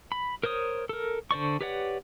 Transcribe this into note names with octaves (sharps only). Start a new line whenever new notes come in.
B5
A#4 C5 C#5 D#6
A4 A#4
D3 C5 D5 C#6
G4 B4 C#5 D5 F#5